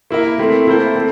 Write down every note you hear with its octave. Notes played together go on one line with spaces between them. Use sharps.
A#3 E4 A#4 E5
A3 C4 E4
A#3 E4 A4 C5
A3 C4